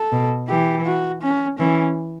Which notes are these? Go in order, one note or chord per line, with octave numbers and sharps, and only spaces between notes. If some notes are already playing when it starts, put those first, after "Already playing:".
Already playing: A4
B2
E3 G4
F#4
C#4
E3 C#4